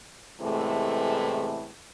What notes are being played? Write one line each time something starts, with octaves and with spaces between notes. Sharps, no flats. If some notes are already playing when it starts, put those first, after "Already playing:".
E2 A2 C3 E3 G#3 A3